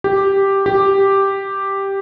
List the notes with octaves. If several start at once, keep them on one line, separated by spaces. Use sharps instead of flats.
G4
G4